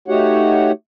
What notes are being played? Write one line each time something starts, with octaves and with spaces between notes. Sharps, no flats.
A3 D#4 F#4 G4 C#5 F#5